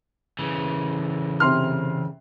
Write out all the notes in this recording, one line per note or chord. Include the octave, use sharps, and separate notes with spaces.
C#3 E3
C3 C6 F6